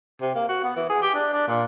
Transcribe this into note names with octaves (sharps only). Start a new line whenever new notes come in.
C3
A#3
F#4
B3
E3
G#4
G4
D4
D4
A#2